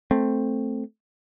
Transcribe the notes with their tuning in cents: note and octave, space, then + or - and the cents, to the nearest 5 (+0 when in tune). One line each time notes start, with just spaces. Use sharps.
A3 +0 C4 +0